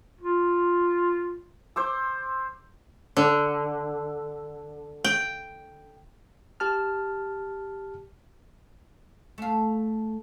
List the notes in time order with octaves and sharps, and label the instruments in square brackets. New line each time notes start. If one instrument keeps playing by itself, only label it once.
[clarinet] F4
[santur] C5 D6 E6
[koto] D3
G5
[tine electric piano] G4 A5 F6
[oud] A3 F5